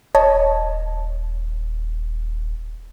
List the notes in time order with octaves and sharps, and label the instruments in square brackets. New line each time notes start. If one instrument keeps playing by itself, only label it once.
[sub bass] D#1 [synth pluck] C#5 D#5 A5